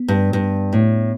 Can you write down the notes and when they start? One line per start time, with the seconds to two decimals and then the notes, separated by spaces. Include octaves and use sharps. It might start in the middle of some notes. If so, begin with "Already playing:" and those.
Already playing: B3
0.08 G2
0.33 G2
0.73 A2